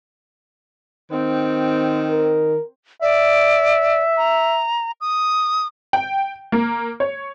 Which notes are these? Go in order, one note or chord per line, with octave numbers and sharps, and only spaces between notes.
D#3 C4
A#4
D5 E5
A#5
D#6
G5
A#3
C#5